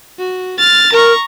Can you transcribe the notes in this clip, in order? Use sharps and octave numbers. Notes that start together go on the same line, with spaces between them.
F#4
F6 A6
A#4 A#5 C#6